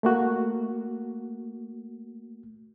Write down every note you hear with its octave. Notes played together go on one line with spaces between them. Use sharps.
A3 A#3 F#4